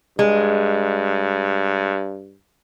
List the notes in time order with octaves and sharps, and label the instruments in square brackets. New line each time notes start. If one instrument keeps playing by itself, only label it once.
[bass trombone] G2 [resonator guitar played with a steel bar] G#3